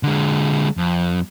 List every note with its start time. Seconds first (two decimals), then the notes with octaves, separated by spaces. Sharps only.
0.03 D3 G#3
0.77 F2